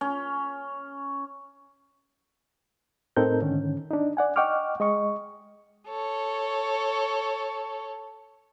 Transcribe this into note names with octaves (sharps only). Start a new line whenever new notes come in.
C#4
A2 C4 D#4 A4 A#4 G6
G#2 D3 D#3 C#4
D4 D#4
D5 F#5 G#5
D#5 F#5 G5 C#6 D6 F6
G#3 D#5 C#6
A4 C#5